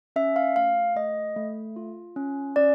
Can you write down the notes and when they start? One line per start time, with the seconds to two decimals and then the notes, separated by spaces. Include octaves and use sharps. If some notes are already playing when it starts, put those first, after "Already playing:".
0.16 C#4 E5
0.36 F5
0.56 A3 F5
0.96 A3 D#5
1.36 A3
1.76 F4
2.16 C#4
2.56 C#4 D5